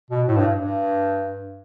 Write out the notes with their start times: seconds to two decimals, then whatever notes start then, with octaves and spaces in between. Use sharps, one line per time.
0.10 B2
0.28 A2
0.37 G2
0.55 G2